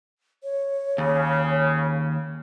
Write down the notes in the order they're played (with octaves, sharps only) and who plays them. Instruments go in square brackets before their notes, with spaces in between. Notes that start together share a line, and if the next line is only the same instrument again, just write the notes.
[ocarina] C#5
[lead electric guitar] D#2 [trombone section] C#3